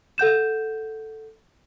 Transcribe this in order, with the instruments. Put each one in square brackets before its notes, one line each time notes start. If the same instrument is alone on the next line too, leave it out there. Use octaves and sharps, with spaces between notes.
[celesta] A4 F#5 G6 E7